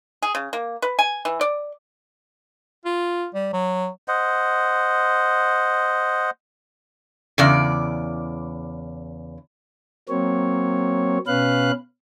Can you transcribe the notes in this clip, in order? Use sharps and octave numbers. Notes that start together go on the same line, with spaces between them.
G#4
C#3
A#3
B4
G#5
E3
D5
F4
G3
F#3
C5 D#5 F#5
E2 C#3 D5
F#3 A#3 C4 C#5
B2 C#4 B4 F5 F#6